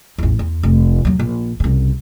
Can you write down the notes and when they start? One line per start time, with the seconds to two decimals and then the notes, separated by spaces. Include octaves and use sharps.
0.18 A1 E2
0.39 E2
0.63 F1
1.05 D#2 F#3
1.19 A#1
1.60 C2 C#3